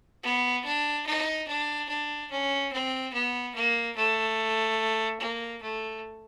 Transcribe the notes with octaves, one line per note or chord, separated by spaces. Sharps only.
B3
D4
D#4
D4
D4
C#4
C4
B3
A#3
A3
A#3
A3